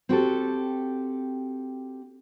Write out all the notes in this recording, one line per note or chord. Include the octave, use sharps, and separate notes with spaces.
C4 F#4 G4 A4